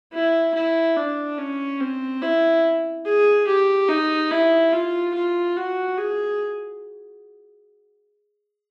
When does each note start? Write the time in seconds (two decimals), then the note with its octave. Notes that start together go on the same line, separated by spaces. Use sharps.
0.12 E4
0.54 E4
0.96 D4
1.38 C#4
1.80 C4
2.21 E4
3.05 G#4
3.47 G4
3.89 D#4
4.31 E4
4.72 F4
5.14 F4
5.57 F#4
5.98 G#4